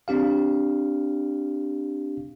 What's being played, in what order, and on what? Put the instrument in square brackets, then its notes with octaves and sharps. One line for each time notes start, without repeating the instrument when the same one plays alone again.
[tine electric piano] C4 D4 G4 F5